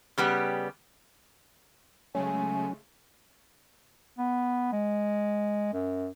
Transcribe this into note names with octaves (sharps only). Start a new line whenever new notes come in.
C#3 G3 B3 G4
C#3 F#3 G#3 A3 C#4 G#5
B3
G#3
F#2